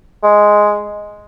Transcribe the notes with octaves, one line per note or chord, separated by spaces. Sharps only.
G#3